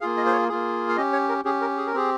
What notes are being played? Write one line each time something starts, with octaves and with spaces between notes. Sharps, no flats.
A#3 F4 G#4 F5
D#5
C5
C#5
A#3 F4 G#4
F5
C#4 G4 D#5
C#5
A#4
C#4 G4 G#4
A#4
G#4
A#4
C4 G4 G#4